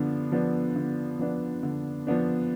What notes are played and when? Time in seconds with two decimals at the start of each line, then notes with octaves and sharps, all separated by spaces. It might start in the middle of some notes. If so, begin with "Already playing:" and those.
Already playing: D3 F3 B3 D4
0.32 F3 B3 D4
0.76 D3
1.19 F3 B3 D4
1.63 D3
2.07 F3 B3 D4